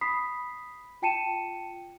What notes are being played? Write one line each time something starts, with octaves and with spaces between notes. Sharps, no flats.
B5 D#6 B6 C7
F4 G5 A5 C#7 D#7 E7